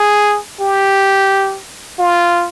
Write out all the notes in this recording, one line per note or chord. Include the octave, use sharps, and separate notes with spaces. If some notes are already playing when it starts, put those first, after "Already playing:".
Already playing: G#4
G4
F4